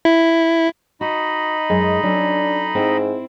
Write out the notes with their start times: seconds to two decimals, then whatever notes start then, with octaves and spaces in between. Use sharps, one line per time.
0.05 E4
1.01 D#4 F#4 D#5 B5
1.70 F#2 G#3
2.03 F#3 C#4 D4 A4
2.75 G#2 C4 E4